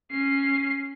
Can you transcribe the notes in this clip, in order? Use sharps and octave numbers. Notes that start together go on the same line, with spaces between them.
C#4 C7